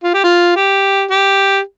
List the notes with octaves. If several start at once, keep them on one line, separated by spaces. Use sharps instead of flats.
F4
G4
F4
G4
G4